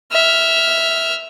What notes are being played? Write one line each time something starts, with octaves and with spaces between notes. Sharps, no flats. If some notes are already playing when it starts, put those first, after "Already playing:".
E5 F6